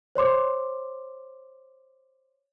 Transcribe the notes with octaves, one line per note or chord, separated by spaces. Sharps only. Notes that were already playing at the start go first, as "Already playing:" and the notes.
C5 C#5 C6 D6